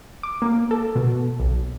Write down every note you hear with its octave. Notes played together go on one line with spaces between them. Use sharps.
D6
A#3
A4
B2
B1